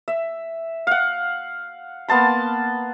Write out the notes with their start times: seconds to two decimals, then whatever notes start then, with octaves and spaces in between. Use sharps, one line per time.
0.08 E5
0.87 F5 F#5
2.08 A#3 B3 A5 C6